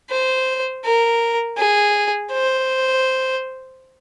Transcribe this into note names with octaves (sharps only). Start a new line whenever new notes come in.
C5
A#4
G#4
C5